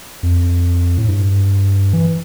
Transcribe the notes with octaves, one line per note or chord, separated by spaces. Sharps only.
F2
A2
G2
E3